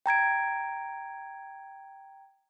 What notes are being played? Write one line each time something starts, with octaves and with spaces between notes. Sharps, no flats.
G5 A#5 G#6 D7